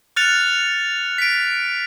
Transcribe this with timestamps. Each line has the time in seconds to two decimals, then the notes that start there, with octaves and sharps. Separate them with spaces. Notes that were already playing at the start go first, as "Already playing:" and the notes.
0.16 F6 F#6 A6 C#7 F7
1.18 B6 D7